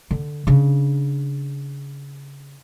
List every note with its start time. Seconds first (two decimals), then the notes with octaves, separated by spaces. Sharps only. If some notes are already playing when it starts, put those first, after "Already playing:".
0.11 D3
0.47 C#3 D4